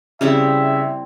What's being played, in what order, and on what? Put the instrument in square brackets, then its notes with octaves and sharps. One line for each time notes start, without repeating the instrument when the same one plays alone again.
[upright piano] C#3 [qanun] G3 C4 E4 [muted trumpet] E5